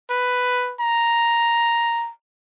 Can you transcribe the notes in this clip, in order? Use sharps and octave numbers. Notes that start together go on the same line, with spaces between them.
B4
A#5